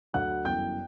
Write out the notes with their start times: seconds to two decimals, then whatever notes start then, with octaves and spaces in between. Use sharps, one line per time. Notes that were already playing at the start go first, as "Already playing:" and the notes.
0.13 D2 D3 F#3 F#5 F#6
0.45 G1 F#2 E3 G5 G6